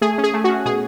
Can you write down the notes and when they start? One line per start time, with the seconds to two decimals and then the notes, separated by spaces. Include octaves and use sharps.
0.01 A3 G#4
0.18 C#4
0.24 G#4
0.34 A3
0.44 C#4 F#4
0.65 B2 G#4